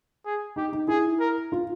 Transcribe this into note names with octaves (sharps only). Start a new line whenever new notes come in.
G#4
D#4 G4
D#4
E4 G#4
A#4
F4